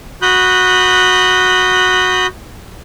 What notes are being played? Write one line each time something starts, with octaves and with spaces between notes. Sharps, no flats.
F#4 B5 D#6 F#6 G6